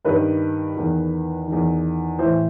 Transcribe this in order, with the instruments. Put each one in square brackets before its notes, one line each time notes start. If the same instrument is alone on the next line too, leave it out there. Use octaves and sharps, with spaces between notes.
[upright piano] G2 D#3 B4
E2 D#3
E2 D#3
A2 E3 C5